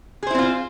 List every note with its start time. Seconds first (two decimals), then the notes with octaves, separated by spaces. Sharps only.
0.23 G#4
0.27 C5
0.31 E4
0.35 C4
0.39 F4